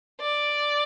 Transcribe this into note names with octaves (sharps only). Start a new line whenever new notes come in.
D5